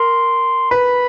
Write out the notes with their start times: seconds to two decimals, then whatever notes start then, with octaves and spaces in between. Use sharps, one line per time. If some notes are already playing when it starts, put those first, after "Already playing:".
Already playing: A#4 C6
0.71 B4 B5